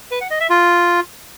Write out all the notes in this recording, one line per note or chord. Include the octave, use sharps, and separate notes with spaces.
B4
F#5
D#5
E5
F4